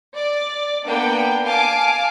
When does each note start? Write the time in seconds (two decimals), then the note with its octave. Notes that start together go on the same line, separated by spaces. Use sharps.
0.16 D5
0.87 A#3 B3 D4 G5
1.45 F5 G#5 A5 D6